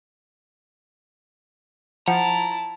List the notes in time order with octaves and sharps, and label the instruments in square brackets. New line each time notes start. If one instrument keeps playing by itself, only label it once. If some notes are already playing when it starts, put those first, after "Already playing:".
[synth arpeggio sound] F3 [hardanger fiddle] E4 A5 [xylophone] F#5 [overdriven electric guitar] A#5